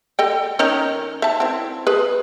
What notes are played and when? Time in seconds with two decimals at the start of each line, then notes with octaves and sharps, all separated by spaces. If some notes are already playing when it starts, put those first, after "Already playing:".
0.19 A4 D#5 G5
0.59 D#3 C#4 A#4
1.22 E5 A5
1.40 C4 E4
1.87 G#4 B4